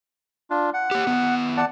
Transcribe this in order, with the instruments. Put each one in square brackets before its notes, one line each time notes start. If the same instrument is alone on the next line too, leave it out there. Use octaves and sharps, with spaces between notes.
[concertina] D4 F4
F#5
[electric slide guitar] A#3 G4
D#3 B3
[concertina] D5 F#5 A5